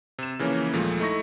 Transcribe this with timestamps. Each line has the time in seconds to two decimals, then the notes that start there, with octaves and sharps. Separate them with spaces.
0.19 C3 E7
0.39 C#3 E3 F3 A#3 C#4
0.73 D#2 A#2 F3 G#3 A3
1.00 A3 D#4 E4 C#6 A#6